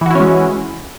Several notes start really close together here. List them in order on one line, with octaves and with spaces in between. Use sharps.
E3 F#4 E4 C#4 G#3